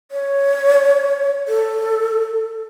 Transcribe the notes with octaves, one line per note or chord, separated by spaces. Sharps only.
C#5
A4